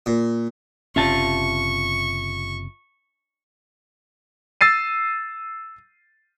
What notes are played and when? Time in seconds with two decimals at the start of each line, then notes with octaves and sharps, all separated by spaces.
0.06 A#2
0.96 F#1 C3 C#4 F4 E5 A5 C#6
4.61 E6 A6 C7 D#7